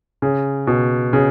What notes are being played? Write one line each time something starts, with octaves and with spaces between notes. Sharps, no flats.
C#3
B2
C#3